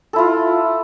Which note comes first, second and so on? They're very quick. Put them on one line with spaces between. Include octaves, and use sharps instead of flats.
A4 E4 F4